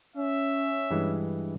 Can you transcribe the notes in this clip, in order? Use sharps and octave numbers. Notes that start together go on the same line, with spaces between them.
C#4 E5
G2 E3 G#3